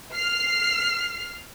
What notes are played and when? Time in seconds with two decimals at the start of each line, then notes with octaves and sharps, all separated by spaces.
0.14 F6 C7